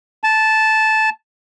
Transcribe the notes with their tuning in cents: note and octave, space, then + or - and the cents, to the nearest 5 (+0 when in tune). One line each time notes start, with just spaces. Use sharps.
A5 -10